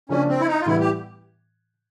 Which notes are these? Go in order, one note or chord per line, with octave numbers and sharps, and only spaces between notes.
C#3 F3 A#3 C#4 D4 F4
C4
E4
D#4
F4
A2 E3 G3 B3 E4
G4